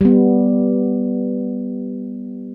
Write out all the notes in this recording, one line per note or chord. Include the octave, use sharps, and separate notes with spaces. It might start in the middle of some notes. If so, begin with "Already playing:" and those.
G3 B3